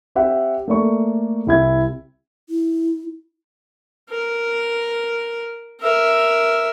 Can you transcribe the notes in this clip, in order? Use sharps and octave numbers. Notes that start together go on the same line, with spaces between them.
C4 G4 E5 F#5
A3 A#3 D5 C#6
C2 E4 G#6
E4
A#4
A#4 E5